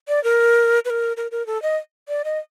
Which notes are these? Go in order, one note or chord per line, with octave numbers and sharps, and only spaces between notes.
D5
A#4
B4
A#4
A#4
A#4
A4
D#5
D5
D#5